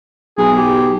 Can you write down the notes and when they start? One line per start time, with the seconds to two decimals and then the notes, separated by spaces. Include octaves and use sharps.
0.38 B1 G#4
0.57 G4